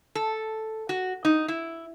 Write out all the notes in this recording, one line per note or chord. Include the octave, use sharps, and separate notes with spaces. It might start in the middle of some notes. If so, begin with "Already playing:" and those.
A4
F#4
D#4
E4